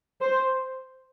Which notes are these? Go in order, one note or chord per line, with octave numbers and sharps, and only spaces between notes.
C5